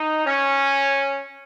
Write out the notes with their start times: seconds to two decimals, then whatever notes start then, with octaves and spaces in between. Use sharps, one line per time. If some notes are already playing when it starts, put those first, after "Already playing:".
Already playing: D#4
0.25 C#4